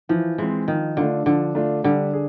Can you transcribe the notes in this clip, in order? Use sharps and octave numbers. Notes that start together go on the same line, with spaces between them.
E3 F3
E3 G#3 C4
D#3 F3
D3 A3 D4 F4
D3 F3
A3 D4 F4
D3 G3
G#4